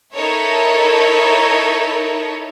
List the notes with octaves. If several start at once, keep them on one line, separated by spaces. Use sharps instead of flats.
D#4 E4 A4 A#4 C#5